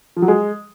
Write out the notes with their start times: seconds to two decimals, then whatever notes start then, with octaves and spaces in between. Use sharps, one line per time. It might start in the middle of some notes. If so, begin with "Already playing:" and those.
0.16 F3
0.22 F#3
0.28 G#3